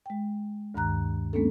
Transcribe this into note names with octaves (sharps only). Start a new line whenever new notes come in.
G#3 G5
D2 G2 D#3 A#5 F#6
G#3 A#3 B3 C#4 D4 A4